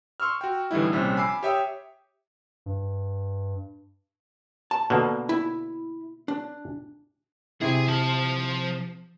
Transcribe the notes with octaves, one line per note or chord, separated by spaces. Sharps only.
C6 C#6 E6 F6
F#4 G5
A2 D3 E3 G3 D#4 E4
A#1 C3 G3 C#4
G#5 B5 D6 E6 C7
G4 C#5 E5 G5 D#6 E6
G2
A5
B2 D3 A#3
E4
D4
C3 E4 G#4
F3 A5